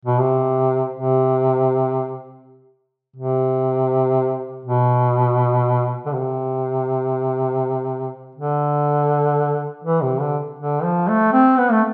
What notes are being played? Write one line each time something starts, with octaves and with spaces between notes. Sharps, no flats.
B2
C3
C3
C3
B2
D3
C3
D3
E3
C3
D3
D3
F3
A3
C4
B3
A3